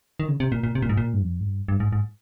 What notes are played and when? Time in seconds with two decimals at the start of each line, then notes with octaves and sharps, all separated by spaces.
0.20 D#3
0.28 C#3
0.40 C3
0.52 A#2
0.63 A#2
0.75 C3
0.82 A#2
0.89 G#2
0.97 A#2
1.14 G2
1.22 F2
1.40 G#2
1.45 G2
1.68 G2
1.80 G#2
1.93 G#2